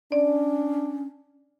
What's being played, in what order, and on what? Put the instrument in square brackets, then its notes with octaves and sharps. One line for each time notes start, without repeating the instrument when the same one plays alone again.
[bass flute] C#4 [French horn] D4 [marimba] D5